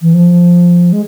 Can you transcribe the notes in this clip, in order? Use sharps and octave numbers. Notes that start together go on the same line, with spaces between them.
E3
F3
G#3